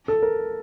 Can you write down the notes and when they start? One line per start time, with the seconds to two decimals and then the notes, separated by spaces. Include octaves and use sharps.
0.08 A4
0.22 A#4